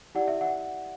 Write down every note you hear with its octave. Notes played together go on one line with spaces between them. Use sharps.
E4 G4 D5 F#5
E5
F#5